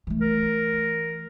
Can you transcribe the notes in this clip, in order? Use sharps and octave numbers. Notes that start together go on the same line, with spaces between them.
E3 A3
A#4